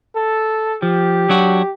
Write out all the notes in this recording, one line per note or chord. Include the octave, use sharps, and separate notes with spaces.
A4
F3 G4
F#3 D4 F#4